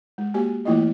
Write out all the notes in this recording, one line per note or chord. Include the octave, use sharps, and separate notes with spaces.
G#3
A#3 F#4 G4 G#5
E3 A3 A#3 E4 F4 D#5